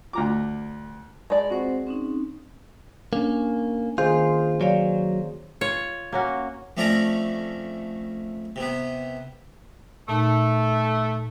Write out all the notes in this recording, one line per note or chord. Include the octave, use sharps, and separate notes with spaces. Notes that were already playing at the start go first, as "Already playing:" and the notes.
D2 A#5 D6
G#3 D5 A5 B5
C4 F#4 C5 F#5
C4 C#4 D#4
A#3 C#4 D4
D#3 A#3 F4 G#4 C5
F#3 C#5 D5 F5
F4 C#5
A#3 C#4 F#4
F2 A3 C#4 D5 A#5
C3 B3
A#2 A3 D#4